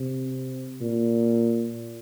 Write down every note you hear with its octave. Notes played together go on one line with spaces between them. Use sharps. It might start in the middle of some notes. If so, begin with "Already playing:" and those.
Already playing: C3
A#2